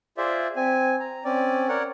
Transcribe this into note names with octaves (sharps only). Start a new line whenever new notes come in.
F4 G#4 C5 D5 E5
C4 G#5
A#5
C4 C#4 D5
A#4 C#5 D5 F#5